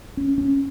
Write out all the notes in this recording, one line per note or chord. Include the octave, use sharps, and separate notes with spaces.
C#4
C#4